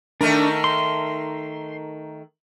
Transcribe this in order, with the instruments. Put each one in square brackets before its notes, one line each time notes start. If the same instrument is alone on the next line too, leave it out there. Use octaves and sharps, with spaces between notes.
[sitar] D#3 A3 A#4 [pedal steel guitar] D4
[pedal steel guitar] C6